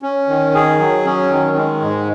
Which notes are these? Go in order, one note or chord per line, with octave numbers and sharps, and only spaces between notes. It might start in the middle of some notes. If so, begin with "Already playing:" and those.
C#4
D#3
G#4
F#3
C#4
D#3
G#3
G#2